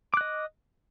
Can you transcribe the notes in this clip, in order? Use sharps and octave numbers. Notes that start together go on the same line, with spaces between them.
D#5 D6 F#6